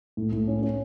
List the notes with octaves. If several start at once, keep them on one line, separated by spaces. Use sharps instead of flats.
A2
A2
C#4
C#4